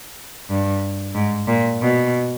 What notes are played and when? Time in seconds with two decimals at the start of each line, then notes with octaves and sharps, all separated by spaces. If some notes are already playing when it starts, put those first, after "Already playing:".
0.49 G2
1.15 G#2
1.47 A#2
1.80 B2